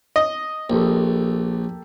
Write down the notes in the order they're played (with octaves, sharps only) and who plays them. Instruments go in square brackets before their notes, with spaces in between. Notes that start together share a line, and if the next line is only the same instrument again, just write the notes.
[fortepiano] D#5
[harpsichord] A#1 [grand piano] A#3 G4 A4